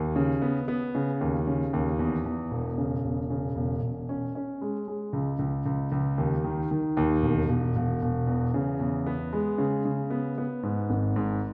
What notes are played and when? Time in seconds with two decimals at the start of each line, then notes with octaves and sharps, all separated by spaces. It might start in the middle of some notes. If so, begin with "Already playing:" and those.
Already playing: D#2
0.16 C#3
0.42 B3
0.68 B3
0.95 C#3
1.21 D#2
1.47 C#3
1.73 D#2
1.99 E2
2.25 E2
2.51 E1
2.78 C#3
3.04 E1
3.30 C#3
3.56 E1
3.82 E1
4.09 C#4
4.35 C#4
4.62 G#3
4.88 G#3
5.13 C#2
5.39 C#2
5.66 C#2
5.92 C#2
6.18 D#2
6.44 D#3
6.71 D#3
6.97 D#2
7.22 E1
7.48 E1
7.76 E1
8.02 E1
8.27 E2
8.54 C#3
8.79 E2
9.06 B3
9.33 G#3
9.58 C#3
9.85 C#3
10.10 B3
10.38 B3
10.63 G#2
10.90 G#1
11.16 G#2